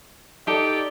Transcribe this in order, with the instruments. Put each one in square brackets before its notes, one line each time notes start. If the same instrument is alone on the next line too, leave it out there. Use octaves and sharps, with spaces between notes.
[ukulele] D#4 A4 [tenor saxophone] G4 [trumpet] D5